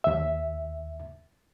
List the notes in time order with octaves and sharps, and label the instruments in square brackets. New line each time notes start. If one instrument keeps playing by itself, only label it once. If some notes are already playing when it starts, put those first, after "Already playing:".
[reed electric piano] D#2 E5